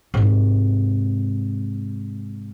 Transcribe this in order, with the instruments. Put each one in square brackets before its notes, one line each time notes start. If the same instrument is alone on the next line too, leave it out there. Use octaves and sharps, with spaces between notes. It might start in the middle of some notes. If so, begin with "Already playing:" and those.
[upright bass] G#2 C3